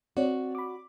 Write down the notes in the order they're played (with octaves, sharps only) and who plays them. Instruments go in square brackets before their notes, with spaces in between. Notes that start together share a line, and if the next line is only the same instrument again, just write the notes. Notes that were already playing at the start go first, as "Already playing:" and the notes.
[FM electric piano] C4 C#5 D5 [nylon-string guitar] F#4
[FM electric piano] B5 D6